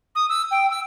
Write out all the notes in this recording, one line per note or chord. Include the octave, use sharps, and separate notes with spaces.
D#6
E6
G5
E6